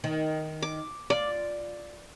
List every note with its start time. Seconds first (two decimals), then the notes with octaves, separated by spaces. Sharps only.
0.04 D#3
0.62 D6
1.10 F4 D5